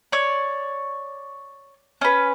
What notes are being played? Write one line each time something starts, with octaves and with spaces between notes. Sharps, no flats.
C#5 D5
C#4 B4